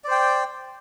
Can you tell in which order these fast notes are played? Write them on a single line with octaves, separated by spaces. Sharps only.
D5 C5 G5